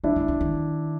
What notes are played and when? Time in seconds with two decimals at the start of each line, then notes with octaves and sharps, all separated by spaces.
0.04 E3 D4 E4
0.16 D#3
0.28 D3
0.41 D#3